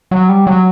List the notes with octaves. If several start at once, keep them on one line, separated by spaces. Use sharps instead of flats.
F#3
G3
F#3